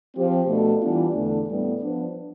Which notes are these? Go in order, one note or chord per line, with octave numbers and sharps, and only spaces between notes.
F3 C4 G4
B2 A3 D4 A4
E3 G3 B3 D4 F4
E2 D3 A3 D4
A2 G3 B3
F3 B3 D4